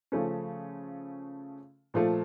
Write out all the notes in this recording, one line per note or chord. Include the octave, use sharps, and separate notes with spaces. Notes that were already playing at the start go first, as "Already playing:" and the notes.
C#3 F3 A3 C#4
A#2 F3 A3